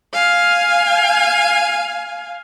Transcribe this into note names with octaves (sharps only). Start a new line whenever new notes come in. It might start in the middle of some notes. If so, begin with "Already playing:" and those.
F5 G#5